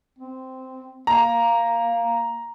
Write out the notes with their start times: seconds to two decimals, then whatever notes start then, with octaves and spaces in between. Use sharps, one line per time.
0.18 C4
1.07 A#3 A#5